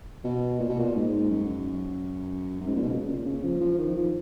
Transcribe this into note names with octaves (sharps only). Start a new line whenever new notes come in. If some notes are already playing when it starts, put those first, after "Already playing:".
B2
A#2
B2
A#2
G#2
F#2
F#2
G#2
A#2
B2
C#3
A#2
C#3
F3
F3
D#3
F3